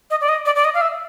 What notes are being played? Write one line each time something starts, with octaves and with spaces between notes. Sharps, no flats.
D#5
D5
D#5
D5
D5
D#5
F5
E5